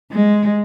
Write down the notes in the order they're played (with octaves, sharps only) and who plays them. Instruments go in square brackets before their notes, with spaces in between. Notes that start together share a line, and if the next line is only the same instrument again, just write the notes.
[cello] G#3